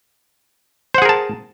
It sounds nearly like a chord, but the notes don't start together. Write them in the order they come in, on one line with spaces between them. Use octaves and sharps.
C5 F#5 G#4 A#4 A5